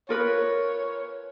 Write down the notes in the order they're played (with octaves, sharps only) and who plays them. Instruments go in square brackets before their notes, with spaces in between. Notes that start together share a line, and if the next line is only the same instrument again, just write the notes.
[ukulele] F4 A#4 B4 [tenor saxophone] C#5